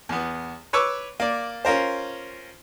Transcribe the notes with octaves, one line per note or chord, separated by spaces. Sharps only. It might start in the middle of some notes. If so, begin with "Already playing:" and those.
E2 B3
B4 C#5 C#6 D6 E6
A#3 D5
C#4 F4 A#4 C5